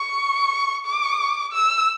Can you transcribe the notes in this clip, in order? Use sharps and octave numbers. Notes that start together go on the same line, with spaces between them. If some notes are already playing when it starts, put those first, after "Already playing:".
Already playing: C#6
D6
E6